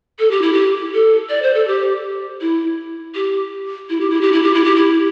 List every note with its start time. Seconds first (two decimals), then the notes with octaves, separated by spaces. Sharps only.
0.19 A4
0.31 G4
0.42 E4
0.53 G4
0.94 A4
1.29 D5
1.43 C5
1.54 A4
1.68 G4
2.41 E4
3.15 G4
3.90 E4
4.01 G4
4.10 E4
4.21 G4
4.32 E4
4.43 G4
4.54 E4
4.64 G4
4.76 E4